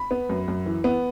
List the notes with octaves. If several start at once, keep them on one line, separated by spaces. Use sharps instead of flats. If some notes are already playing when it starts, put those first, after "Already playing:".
Already playing: B5
B3
F#2
F#2
E3
B3